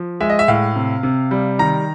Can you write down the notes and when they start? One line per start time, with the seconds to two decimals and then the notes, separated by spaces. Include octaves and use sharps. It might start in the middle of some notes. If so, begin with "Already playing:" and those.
Already playing: F3
0.21 G#3 E5
0.30 D#5
0.39 E5
0.48 A2 F5
0.76 C3
1.03 C3
1.31 G3
1.59 D#3 A#5